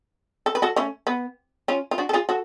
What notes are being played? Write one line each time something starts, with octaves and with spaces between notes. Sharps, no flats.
A4
B4
F#4 A4
A3 C#4
B3
C#4 F4
F4
D4 F#4
A4
F4 G#4
F#4 A4